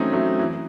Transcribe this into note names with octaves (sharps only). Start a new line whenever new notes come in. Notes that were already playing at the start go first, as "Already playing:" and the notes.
Already playing: E3 F#3 A3 C4 C#4 D#4
F#3 A3
E3